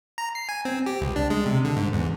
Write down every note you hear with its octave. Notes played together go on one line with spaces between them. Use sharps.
A#5
C7
G#5
C4
G4
C#2
D4
G#3
C3
D3
G#2
E2